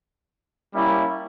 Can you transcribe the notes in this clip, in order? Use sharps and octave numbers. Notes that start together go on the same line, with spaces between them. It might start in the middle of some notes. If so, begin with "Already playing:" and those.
G3 A#3 C#4 E4